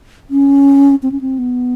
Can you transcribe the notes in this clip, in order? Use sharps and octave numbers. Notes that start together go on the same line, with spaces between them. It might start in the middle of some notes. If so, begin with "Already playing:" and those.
C#4
C4
C#4
C4
B3